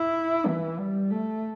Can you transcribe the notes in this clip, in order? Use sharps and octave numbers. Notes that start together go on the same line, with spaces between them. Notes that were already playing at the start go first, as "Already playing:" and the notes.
Already playing: E4
E3
G3
A3